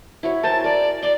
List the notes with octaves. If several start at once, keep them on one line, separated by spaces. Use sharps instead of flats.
E4 F#4 C#5
A#4 C5 G#5 A5
A#4 D5
D5 C6 D6